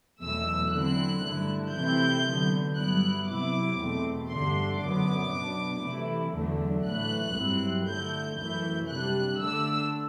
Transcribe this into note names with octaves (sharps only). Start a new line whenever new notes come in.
E2 B2 F#3 A3 E6
D3 F#3 C4 E4 F#6
G2 D3 A3 E4
C3 E3 A3 C4 E4 G6
D3 F#3 B3
G2 F#3 B3 E4 F#6
C3 F#3 B3 E4 D6
E2 B2 A3 C4
G2 D3 A3 D4 C6
F#2 D3 F#3 B3 D6
B2 F#3 B3 D4
C3 E3 A3 E4
E2 D3 F#3 A3 D4
A2 E3 A3 F#6
G2 F#3 C4 E4
D3 A3 E4 G6
F#2 E3 A3 E4 G6
C3 G3 D4 F#6
D3 A3 D4 E6